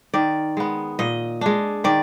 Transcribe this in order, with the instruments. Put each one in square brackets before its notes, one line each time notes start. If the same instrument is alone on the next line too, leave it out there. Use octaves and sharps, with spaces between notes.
[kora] D#3 D5
G#3 B3
A#2 D#5
G#3 D4
D#3 D5